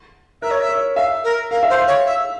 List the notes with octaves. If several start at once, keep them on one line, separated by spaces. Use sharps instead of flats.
A#4 E5
C#5
E5
C#5
E5 F5
A#4
A#4 F5
E5
C5
F5
C#5
E5